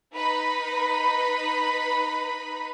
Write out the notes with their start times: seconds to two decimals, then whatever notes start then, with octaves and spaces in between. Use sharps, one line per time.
0.15 D#4 B4 B5